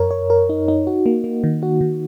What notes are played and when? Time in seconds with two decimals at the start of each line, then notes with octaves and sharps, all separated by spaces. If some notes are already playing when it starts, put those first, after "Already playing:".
Already playing: F#2 A#4 C#5
0.11 C#5
0.30 A#4
0.49 D#4
0.68 D#4
0.87 F#4
1.06 A#3
1.24 A#3
1.44 D#3
1.63 F#4
1.81 D#3